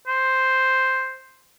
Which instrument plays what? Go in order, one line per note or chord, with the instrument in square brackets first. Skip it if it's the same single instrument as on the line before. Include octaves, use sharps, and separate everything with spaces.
[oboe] C5